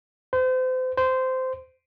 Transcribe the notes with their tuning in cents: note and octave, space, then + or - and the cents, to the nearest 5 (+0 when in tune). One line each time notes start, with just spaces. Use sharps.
C5 -35
C5 -15